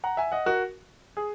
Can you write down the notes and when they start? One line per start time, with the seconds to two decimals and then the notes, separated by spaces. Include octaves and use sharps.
0.04 F#5 A#5
0.17 E5 G#5
0.32 D#5 F#5
0.46 F#4 A#4
1.17 G#4